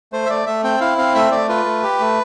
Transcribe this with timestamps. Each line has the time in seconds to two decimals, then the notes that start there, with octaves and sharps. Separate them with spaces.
0.13 A3 C5
0.26 E5
0.29 A3 D5
0.46 A3 E5
0.63 C4 G5
0.81 E4 F5
0.98 C4 F5
1.15 A3 E5
1.32 A3 D5
1.49 F4 B4
1.65 A3
1.83 G4
2.00 A3